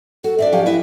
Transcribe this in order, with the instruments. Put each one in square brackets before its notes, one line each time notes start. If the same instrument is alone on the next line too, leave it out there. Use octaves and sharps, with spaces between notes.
[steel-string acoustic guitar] F#4 [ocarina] A4
[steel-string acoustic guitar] C4 D4 D5 [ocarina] E5
[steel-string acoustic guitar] F3 C#4 G4 [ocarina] F5
[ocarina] E4 [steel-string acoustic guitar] B4 D#5 E5